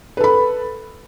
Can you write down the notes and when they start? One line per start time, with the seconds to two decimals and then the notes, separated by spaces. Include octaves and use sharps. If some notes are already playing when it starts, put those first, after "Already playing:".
0.17 B4
0.20 A4
0.24 B5